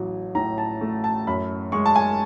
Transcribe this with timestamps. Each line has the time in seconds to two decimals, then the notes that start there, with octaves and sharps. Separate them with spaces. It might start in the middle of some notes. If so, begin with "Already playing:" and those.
Already playing: A1 F#3
0.35 A2 A#5
0.58 A5
0.81 A3
1.04 A5
1.27 F#2 B5
1.72 G#3 C#6
1.86 A5
1.96 G#5